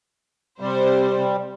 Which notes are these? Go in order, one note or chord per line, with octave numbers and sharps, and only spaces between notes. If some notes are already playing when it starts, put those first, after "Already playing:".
C3 G3 C5